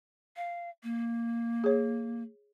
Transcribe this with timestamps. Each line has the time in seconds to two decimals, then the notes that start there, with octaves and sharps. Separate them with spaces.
0.37 F5
0.83 A#3
1.64 G#4 C#5